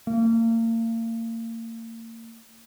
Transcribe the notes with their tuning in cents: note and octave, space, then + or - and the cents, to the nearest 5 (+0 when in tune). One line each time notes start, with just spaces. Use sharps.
A#3 -35